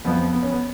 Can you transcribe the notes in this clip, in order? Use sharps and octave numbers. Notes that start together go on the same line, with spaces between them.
F2 F3 B3
B3
C#4
B3